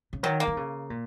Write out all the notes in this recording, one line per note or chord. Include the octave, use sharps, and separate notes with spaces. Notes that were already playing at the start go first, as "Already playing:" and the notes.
C#3
D#3 F#3
A#3
D#3
C#3
A#2